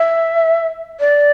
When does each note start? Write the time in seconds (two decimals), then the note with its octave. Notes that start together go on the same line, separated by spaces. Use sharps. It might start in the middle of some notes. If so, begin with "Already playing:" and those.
Already playing: E5
1.00 D5